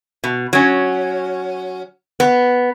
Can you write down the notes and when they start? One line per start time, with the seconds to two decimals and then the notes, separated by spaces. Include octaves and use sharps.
0.24 B2
0.53 F#3 C#4
2.20 B3